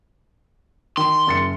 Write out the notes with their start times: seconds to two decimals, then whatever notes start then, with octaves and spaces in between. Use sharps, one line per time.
0.97 D#3 C6
1.27 F#1 A6 C#7